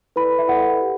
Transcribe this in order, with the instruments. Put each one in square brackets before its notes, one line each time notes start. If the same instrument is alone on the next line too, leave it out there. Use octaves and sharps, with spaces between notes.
[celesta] E4 A4 B4 D5 B5
E5
E4 A4 D5 F#5
G4